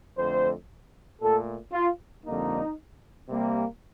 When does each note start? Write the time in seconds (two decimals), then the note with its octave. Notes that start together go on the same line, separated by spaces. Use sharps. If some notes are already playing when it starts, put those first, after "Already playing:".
0.17 F2 D3 A3 C5
1.21 A#2 A3 A4
1.73 F4
2.25 F2 D3 G3 A#3 D#4
3.29 C3 G3 A#3